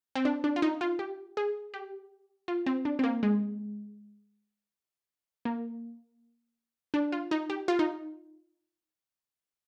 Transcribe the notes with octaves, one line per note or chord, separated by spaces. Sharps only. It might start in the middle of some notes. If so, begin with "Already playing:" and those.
C4
D4
D4
F4
D#4
F4
G4
G#4
G4
F4
C4
D4
C4
A#3
G#3
A#3
D4
F4
D#4
G4
F4
D#4